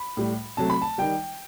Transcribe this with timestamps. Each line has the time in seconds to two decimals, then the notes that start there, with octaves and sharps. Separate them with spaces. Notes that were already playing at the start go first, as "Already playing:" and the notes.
Already playing: B5
0.17 A2 G3
0.57 C3 F#3 A3 A5
0.70 B5
0.82 A5
0.98 D#3 G3 G5